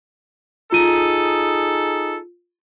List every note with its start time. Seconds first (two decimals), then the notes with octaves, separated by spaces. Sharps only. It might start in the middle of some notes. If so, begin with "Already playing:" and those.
0.72 D#4 F4 G#4 A4 D#7